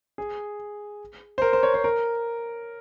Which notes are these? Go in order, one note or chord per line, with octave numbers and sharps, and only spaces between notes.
G#4
C5
A#4
C5
C#5
C5
A#4